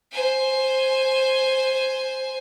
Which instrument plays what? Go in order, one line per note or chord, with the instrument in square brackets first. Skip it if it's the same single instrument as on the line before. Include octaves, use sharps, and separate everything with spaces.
[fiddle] C5 G#5